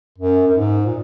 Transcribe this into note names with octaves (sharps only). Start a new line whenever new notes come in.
F#2
F#2
G#2
A#2